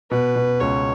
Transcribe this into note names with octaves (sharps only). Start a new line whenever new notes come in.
B2 B4
B2
C#2 C#5